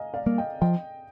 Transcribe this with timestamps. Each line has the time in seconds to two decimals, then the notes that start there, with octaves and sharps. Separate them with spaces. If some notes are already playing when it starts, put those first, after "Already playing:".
Already playing: D#5 F5 G#5 A#5
0.14 D5 F5
0.26 G3 A#3
0.38 D#5 G5
0.61 F3 D#5 G5